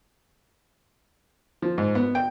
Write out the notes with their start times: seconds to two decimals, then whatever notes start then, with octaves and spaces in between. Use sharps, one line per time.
1.62 F3
1.78 G#2
1.95 B3
2.15 G5